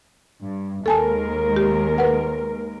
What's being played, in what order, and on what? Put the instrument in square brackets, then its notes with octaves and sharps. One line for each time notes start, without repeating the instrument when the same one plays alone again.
[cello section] G2
[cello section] D#2 G#3 A#4 [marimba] A4 G#5 A5
[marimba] G4
B4 F#5